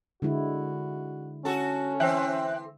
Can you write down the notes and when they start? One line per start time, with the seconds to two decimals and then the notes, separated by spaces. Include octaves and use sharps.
0.22 D3 G#3 E4 F#4
1.45 C#4 F#4 A4
2.00 E3 C4 E5 G5 F#6